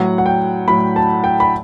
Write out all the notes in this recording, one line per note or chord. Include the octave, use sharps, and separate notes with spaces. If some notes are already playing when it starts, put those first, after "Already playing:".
Already playing: A2 F#3 F#5
F#5
G5
A2 F#3 B5
A5
G5
B5